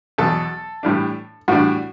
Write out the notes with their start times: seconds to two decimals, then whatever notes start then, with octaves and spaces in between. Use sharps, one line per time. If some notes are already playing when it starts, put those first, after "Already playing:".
0.18 E2 B2 F#3 A4
0.83 A2 E3 G3 D4
1.48 A2 E3 G3 D4 F#4